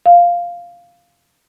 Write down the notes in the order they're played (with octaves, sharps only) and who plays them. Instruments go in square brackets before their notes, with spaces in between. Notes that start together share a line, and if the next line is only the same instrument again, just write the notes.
[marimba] F5